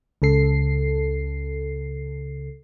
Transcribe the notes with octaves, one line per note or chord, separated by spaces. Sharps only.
C#2 C#3 A4 C7